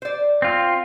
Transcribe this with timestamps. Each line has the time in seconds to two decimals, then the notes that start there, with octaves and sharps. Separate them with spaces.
0.02 C5 D5
0.42 C4 F4